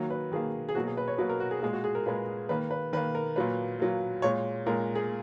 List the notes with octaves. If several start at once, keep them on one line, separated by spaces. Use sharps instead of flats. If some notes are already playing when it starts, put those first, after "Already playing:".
Already playing: D#3 F#3 A#3
B4
D#3 F#3 A#3 G#4
G#4
B2 F#3 A#3 F#4
G#4
B4
C#5
B2 F#3 A#3 B4
A#4
F#4
G#4
A#2 G#3 G#4
F#4
G#4
A#4
A#2 G#3 B4
D#3 A#3 B4
B4
D#3 A#3 B4
A#4
A#2 F#3 A#3 B4
A#2 F#3 A#3
A#2 G#3 C#5
A#2 G#3 A#4
G#4